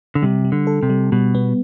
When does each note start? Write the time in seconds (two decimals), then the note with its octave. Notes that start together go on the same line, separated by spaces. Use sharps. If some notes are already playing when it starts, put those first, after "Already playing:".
0.15 D3
0.22 C3 G3
0.45 G3
0.52 D3
0.67 A4
0.83 C3
0.90 G3
1.12 B2 G3
1.35 B3